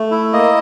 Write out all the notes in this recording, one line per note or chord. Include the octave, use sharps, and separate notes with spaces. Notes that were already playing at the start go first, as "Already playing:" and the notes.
Already playing: A3
E4
A#3 D#5